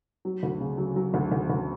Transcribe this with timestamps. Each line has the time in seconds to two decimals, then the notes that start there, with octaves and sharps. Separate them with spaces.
0.25 F#3
0.43 D2
0.60 C#3
0.78 F#3
0.96 F#3
1.14 D2
1.32 D2
1.50 D2